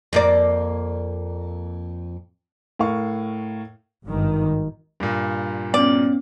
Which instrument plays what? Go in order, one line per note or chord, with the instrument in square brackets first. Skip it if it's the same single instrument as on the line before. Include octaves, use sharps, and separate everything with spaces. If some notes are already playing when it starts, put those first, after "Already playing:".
[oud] F2 A#3 D5
[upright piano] A2 A#4 F5 C#6
[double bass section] G#1 G2 D#3
[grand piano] G2 A#2
[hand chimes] B3 C#4 [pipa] D5